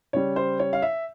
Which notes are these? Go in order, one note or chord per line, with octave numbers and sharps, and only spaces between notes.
C#3 G3 C#5
C5
C#5
F5
E5